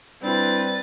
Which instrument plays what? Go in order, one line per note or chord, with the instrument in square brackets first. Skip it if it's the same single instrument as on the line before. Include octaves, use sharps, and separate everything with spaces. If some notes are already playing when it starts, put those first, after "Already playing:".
[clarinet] G3 [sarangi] C4 [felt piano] D4 E4 [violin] B4 A6